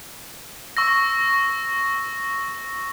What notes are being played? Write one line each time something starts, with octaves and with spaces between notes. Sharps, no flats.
C#6 E6 A#6